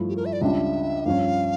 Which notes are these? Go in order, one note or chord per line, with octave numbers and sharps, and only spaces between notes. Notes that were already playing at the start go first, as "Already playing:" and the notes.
Already playing: G2 F3 A3 E4
G4
A#4
E5
D5
C#2 C#3 G3 D4 F4 E5
G2 F3 C#4 F5